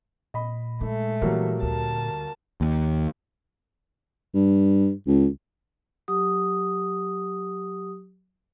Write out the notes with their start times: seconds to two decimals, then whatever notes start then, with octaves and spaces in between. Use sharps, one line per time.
0.34 A#2 D#5 B5
0.81 G#3 A3 D#4
1.22 E3 F#3 G3 A#3
1.62 D2 A#4 A5
2.61 D#2
4.34 G2
5.07 C#2
6.08 F#3 G4 D#6